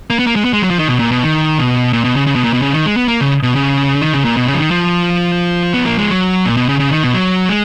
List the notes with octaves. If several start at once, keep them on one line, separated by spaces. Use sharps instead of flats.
A#3
B3
A#3
G#3
B3
G#3
F#3
F3
D#3
B2
A#2
B2
D#3
B2
A#2
B2
C#3
C#3
B2
A#2
B2
C#3
D#3
G#3
B3
A#3
C#3
B2
C#3
D#3
C#3
A#2
B2
C#3
F3
D#3
F3
B3
A#3
G#3
F#3
A#2
B2
C#3
C#3
D#3
B2
F#3
G#3